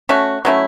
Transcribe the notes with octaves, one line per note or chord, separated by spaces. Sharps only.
A3 C#4 F#4
F#3 A3 C#4 E4